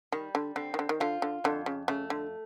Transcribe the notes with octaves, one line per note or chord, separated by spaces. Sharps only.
D#3 G3
D3
D3 C4
D#3
D3
D#3
D3 F4
D3
F2 D3
C#3
C#3 A3
D3